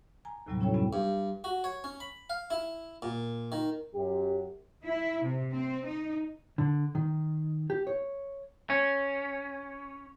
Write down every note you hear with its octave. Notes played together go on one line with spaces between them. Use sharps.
G#5 A#5
D#2 A2 C3 F#3 G3 B3
C#4 E4 F#4 A4 C#5 G5
F#2 C3 G3 G#3 B3 C#4
G2
F#4
C#5
C#4
B5
F5
E4
A#2
D#3
F#2 G4
E4
C3
C4
D#4
D3
D#3
G4
C#5
C#4